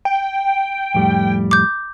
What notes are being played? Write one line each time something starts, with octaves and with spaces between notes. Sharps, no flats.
G5
F2 A2 G3
D6 G6